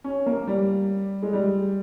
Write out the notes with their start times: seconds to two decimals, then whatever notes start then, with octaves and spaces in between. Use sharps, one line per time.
0.04 C#4
0.26 A#3
0.47 G3
1.23 G#3
1.33 G3